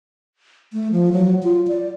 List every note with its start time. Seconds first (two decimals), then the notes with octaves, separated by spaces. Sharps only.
0.73 A3
0.92 F3
1.13 F#3
1.43 F4
1.68 D5